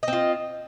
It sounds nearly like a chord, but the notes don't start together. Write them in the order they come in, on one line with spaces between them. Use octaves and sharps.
D#5 C4 F4